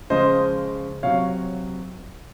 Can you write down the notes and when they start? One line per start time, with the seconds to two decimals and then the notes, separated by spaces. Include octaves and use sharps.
0.10 C#3 F3 G#3 C5 D#5
1.03 C3 F#3 C#5 F5